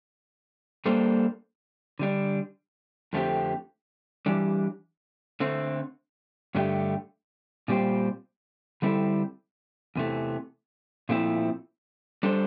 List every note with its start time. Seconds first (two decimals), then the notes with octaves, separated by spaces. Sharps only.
0.86 G3 A#3 D4 A4 C5
1.99 D3 G3 D4
3.13 F2 D3 A3 C4 G4
4.26 E3 G3 D4 G4
5.40 D3 A3 C4
6.55 G2 D3 A3 D4 G4
7.68 A#2 G3 C4 G4 C5
8.82 D3 G3 C4 E4 A4
9.96 E2 C3 E3 A3
11.09 A#2 F3 A3 C4 E4
12.23 G3 D4 A4 C5